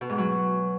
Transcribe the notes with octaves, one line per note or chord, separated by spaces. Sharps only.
B2
G#2
F#3